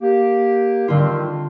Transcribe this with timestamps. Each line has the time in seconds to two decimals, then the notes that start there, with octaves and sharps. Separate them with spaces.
0.01 A#3 G4
0.88 D3 D#3 G3 C4 F4